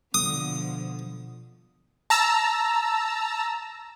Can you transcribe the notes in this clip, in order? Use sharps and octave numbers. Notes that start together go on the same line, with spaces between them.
B2 D3 F3 D#6
A5 A#5 E6